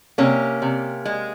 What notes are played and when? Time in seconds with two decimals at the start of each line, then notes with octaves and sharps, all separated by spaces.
0.18 C3 A#3 C#4
0.62 C3
1.05 G#3